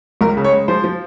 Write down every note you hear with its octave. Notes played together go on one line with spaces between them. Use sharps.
C#2 A#4
C#3
C#5
G#3
F3 C5
F3